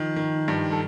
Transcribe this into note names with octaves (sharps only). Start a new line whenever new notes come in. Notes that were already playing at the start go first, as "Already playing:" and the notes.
Already playing: D#3 F3
D#3
G2
A4